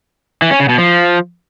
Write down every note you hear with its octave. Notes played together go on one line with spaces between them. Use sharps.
E3
C#4
C#3
B2
F3